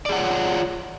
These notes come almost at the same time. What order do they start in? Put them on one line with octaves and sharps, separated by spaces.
D5 G#4 F#5 C#5 F4